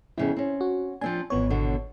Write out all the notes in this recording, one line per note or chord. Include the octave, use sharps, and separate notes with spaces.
F2 C#3 B3 E4
C4 C#4
F#4
F3 C4 D4 G#5
G#1 F2 E3 B3 C#5
B2 D3